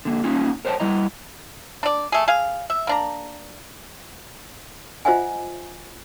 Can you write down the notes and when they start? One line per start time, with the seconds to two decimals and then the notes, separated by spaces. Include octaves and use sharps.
0.05 D3 A#3
0.24 A#3 C#4 D#4 F4
0.65 A#4 C5 C#5 F5 G5 A5
0.80 G3 E4 D#5 A#5
1.83 D4 D5
2.12 A3 G#4
2.28 G#4 F5
2.70 E5
2.87 A#3 D4 A#5
5.05 F4 C5 D#5 E5 F#5 G#5